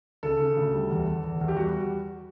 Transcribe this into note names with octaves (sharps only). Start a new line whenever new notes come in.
C#3 A4
C#3
D2
G3
E2
E2
E2
E2
G4
G3 F#4